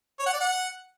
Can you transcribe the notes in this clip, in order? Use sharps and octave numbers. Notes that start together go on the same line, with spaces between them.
C#5
F#5
D5
F#5